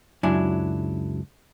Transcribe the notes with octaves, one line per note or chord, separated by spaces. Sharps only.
C#2 F#2 F#3 D4 E4 G#5